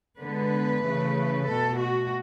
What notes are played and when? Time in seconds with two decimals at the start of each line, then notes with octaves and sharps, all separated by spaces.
0.20 D3 G#3 B3 B4
0.83 C#3 E3 A3
1.46 B2 A3 A4
1.78 F#4